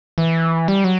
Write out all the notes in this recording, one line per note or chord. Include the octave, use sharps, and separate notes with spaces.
E3
G3
F#3